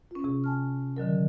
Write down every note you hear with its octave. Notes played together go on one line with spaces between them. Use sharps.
C#4 F4
C3 G#4
G#5 A5 F6
D3 D#3 F#3 A#4